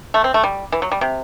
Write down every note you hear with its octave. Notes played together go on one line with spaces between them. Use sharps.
A3
C4
A3
G3
E3
F#3
G3
C3